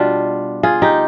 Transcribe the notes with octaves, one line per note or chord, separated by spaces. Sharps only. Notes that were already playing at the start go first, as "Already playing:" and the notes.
Already playing: B2 G3 D4 F4
F4 G#4
D#4 G4